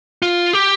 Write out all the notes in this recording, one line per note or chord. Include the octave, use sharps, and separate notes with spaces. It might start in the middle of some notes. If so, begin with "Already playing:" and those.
F4
G4